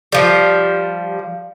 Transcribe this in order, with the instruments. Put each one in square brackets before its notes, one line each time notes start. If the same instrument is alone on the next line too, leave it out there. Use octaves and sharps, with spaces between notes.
[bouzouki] F3 G3 [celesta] D5 F5